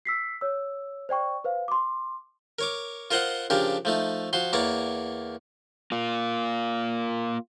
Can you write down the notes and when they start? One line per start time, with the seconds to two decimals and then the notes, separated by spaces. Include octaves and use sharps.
0.05 E6 B6 C7
0.41 C#5 E6
1.09 C5 D5 G5 C#6
1.44 B4 C5 F5
1.68 C6 D6
2.59 A#4 C#5 D6
3.11 F4 A#4 C5 D#5 F#5
3.50 C#3 F3 D4 G4 A#4
3.85 F3 A3 D#4
4.33 F3 F#4 C6
4.53 E2 A#3 A#4 C#5 D5 A#5
5.92 A#3 F4